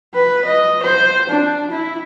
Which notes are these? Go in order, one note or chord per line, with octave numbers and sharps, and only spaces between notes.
B4
D#5
C5
D4
E4